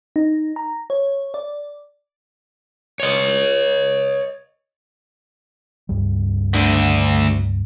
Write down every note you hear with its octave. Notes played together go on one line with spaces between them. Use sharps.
D#4
A#5
C#5
D5
C#5 D#5
C#2 G2 G3
D2 D3